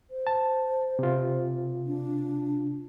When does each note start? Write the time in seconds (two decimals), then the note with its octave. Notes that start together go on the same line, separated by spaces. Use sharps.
0.10 C5
0.27 A5
0.99 C3 F4
1.87 D4